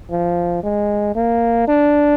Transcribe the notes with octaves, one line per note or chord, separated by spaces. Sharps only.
F3
G#3
A#3
D4